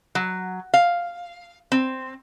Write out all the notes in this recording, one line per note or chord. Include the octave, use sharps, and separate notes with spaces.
F#3
F5
C4